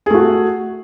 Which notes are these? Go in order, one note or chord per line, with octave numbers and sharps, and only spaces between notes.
A3 F#4 G#4